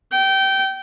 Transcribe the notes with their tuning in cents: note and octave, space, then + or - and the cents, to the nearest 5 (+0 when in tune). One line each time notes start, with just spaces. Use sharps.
G5 -20